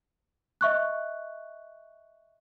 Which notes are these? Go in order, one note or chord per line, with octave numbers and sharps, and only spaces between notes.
D#5 E5 C#6 F#6